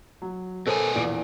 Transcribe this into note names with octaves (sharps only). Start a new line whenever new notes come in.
F#3
B2 B3 A4 A#4 C5 G#5
A#1 E2 D7